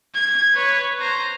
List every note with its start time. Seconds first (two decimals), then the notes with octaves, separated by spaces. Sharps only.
0.15 G#6
0.54 B4 C#5
1.00 C5 A#5